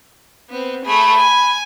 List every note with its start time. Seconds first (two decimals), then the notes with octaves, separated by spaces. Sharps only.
0.49 B3 C4
0.85 A3 G#4 B5
1.18 G#5